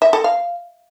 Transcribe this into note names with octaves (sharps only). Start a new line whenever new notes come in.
E5
A4
F5